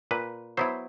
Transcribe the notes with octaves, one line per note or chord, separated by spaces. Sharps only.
A#2 B4
F#3 B3 E4 C5